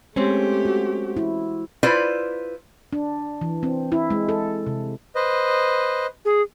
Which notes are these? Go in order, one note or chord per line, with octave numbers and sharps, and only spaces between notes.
G#3 A3 C4 C#4 G4 C5
F#4
E4
E4 F4 B4 C5 D5
D4
E3
C4
E4
G#3
A4
C3
B4 C5 D#5
G#4